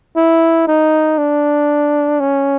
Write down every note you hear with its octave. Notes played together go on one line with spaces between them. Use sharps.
E4
D#4
D4
C#4